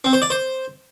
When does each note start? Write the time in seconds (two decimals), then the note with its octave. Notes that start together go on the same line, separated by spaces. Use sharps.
0.04 C4
0.13 C5
0.22 D5
0.30 C5